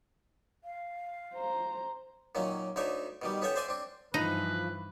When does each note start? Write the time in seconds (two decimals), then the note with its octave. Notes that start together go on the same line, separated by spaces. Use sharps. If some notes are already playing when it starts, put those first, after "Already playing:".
0.64 F5
1.34 C5 A#5
2.35 A#2 D#3 F#3 C#4
2.76 D2 D3 D#4 C#5 E5
3.22 B2 D#3 G3
3.42 B3 C#4 A4 C#5 E5 G5
3.56 C5 D5 E5 G#5 C6
3.68 C4 D4
4.14 G2 E3 F3 D#4 B4